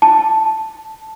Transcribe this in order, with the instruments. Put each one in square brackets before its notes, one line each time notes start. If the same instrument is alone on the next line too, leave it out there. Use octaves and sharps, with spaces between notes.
[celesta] A5